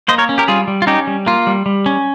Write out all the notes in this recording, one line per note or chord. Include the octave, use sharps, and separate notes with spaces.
A#3 C5 D#5
A#4 C#5
C#4
G4 A#4
G3 F4 G#4
G3
F4
C#4 D#4 G4
G3
A#3 F4
G3
G3
C#4